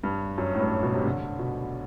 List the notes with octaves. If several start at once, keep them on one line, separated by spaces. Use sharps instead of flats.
G2
F#2
A2
G2
B2
C3
D3
B2